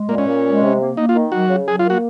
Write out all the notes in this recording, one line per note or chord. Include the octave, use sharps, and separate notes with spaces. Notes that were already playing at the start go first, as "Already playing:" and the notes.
Already playing: G#3
A#2 A#3
C#4
A#2
G#3
C3
A#3
A#3 D#4
F4
D#3
F#3 F#4
C#3
F#3 G#4
F4
A#3
F#4